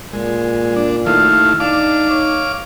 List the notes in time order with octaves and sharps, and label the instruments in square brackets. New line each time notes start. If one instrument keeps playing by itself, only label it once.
[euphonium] A#2 [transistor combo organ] G#3
[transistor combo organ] D4
[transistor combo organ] D#3 A3 E4 [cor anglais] F5
[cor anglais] D4 [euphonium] D#4 [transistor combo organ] F5 D6
[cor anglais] C#5